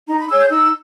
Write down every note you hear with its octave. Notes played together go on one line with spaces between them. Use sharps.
D#4 A#5
B5
G#4 C#5 E6
G6
D#4 E6